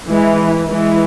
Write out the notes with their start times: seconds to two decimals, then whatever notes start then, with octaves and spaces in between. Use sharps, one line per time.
0.09 E3 G#3
0.70 E3 G#3